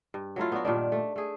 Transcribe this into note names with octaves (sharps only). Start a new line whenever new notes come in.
G2
F#3 A3 E4 F4
B3 D4 F#4
G2 A#2 D#3 D4
A3
A3 G#4